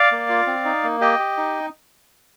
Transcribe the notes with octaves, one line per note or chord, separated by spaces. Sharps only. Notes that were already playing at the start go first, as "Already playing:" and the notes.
Already playing: D5 F5
A#3
F4
C4
D#4
A#3
G4 D#5 G5
G4
D#4